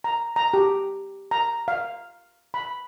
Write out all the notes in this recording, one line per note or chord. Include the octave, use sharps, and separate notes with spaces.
A#5
A#5
G4
A#5
F5
B5